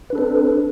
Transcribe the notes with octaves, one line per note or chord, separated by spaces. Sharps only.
C4 D4 A4 B4